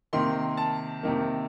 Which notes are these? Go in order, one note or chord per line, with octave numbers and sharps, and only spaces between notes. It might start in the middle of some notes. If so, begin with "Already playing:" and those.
C3 D#3 A#3 C6
A5
C3 D#3 A#3